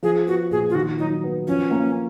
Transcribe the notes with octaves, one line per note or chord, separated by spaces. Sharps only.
F3 G#4
B3 F#4
A#2 G#4
F4
D#3 F#4
F#3 D#4
B3
F3 C#4
A#3